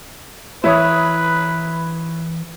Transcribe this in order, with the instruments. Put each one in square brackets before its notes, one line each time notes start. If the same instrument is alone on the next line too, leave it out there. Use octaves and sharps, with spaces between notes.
[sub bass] E3 [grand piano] E4 C#5 D#6 [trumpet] B4